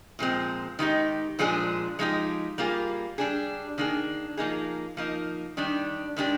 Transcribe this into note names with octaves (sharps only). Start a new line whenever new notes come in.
A#2 F3 G#3 C4
D#3 G#3 D#4 G4
A#2 F3 G#3 D4 G#4
F3 G#3 D#4 G4
G3 A#3 F4 G#4
G3 D4 G#4
D#3 A#3 D4 G#4
F3 A#3 D#4 G#4
F3 A#3 D#4
D#3 G3 D4 G4
D#3 G#3 D4 G4